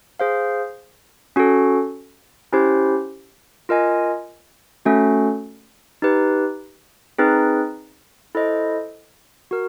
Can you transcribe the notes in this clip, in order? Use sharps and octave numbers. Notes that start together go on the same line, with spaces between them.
G#4 C5 F5
C#4 F#4 A4
C#4 E4 G4 C5
F4 A#4 D#5 G#5
A3 C#4 F#4 A4
D#4 G4 B4
C4 D#4 G#4 B4
E4 A4 C5 D#5
F#4 A#4